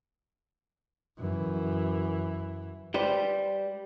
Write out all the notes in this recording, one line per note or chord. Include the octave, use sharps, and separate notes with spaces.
F#2 E3
G3 B4 C5